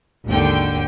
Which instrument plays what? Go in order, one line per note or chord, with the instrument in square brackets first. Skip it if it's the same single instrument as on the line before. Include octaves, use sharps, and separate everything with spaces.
[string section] G#1 D#2 D3 G5